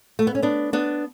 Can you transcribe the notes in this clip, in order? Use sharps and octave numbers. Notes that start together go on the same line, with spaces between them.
A3
B3
C#4
B3 D4
B3 D4